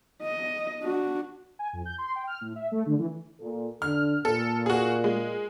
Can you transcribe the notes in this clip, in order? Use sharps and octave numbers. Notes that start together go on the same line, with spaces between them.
D#5
D4 F#4
G#5
F2
G6
C6
G5
F6
A2
E5
A3
D3
E3
A#2 A4
D3 F6
A#2 A4
F#4 G#4
G#3